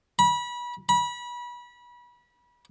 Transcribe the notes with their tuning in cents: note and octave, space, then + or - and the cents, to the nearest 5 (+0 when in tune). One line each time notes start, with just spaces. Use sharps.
B5 -30
B5 -30